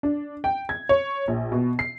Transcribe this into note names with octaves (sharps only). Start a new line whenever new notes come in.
D4
G5
G#6
C#5
A#1
B2
C7